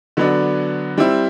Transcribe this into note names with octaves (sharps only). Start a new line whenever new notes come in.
D3 F#3 B3 D4
G3 C4 E4